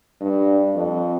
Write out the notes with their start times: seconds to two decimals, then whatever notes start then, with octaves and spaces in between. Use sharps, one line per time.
0.21 G2
0.75 F2